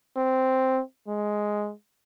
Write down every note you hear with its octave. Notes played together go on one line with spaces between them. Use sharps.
C4
G#3